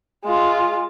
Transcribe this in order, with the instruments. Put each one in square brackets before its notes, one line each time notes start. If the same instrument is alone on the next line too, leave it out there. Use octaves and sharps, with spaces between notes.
[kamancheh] G#3 F4